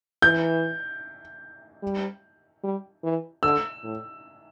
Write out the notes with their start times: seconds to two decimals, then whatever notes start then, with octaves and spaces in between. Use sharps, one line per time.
0.22 E3 G6
1.82 G3
2.64 G3
3.03 E3
3.43 D3 E6
3.84 A2